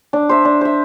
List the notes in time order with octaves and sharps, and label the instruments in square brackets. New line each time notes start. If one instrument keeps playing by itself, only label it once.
[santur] D4
C5 E5
D4
C5 E5